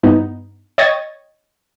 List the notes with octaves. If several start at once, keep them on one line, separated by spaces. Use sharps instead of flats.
G2 B3 D#4
C#5 D#5 G5 C#6 G#6 A6